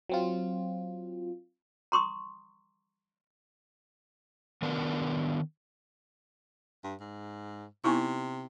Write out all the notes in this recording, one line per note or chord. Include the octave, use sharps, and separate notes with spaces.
F#3 C4 F4
A#5 C6 C#6 D#6
D#3 B3 D4 A#4 B4
G2
G#2
C3 B3 D#4 E4